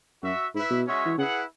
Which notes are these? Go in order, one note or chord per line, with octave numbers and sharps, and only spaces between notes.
F#2 F#4 E5
G#2 E4 B4 E5
B2
G#3 C#4 F#4 C#5 E5
E3
C#3 E4 G#4 B4 F#5